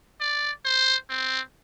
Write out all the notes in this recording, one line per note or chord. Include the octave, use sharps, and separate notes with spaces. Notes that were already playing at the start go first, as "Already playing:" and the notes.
D5
C5
C4